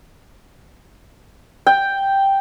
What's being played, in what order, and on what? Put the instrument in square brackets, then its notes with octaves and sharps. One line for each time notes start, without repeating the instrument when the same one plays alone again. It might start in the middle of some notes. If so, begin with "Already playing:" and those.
[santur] G5